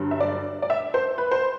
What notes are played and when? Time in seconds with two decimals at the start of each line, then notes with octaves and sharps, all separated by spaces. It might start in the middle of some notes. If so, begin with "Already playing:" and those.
Already playing: G2 D3 F#3
0.11 E5
0.20 D5
0.62 D5
0.70 E5
0.94 C5
1.18 B4
1.31 C5